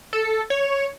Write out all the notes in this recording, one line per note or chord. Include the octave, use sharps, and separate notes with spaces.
A4
C#5